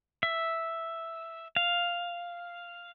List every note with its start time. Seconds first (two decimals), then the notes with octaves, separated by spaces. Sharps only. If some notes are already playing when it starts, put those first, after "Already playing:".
0.23 E5
1.56 F5